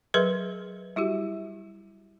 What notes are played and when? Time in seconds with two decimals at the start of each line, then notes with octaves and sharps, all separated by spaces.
0.14 F#3 G#4 A#4 B4 E5 C6
0.96 G3 E4 F#4 G4